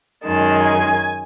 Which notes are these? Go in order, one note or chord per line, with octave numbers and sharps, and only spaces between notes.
F#2 D#3 G#3 A5
G#5